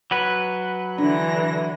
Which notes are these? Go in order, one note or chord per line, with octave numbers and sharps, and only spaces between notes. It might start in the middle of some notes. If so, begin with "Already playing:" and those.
F#3 B4
D3 E3 D4 A#6